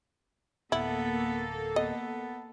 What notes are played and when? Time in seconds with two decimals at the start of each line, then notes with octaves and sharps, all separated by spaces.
0.72 D1 A#3 B3 E4 A4
1.76 B3 D#5